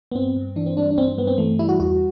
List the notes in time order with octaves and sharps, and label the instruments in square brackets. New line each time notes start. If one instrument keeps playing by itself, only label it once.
[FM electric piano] B3
G2 C4
G2
E3 D4
C4
G3 D4
D4
G2 C4
C4
G2 B3
C4
E3 A3
G3 E4
F#4
E2 F#4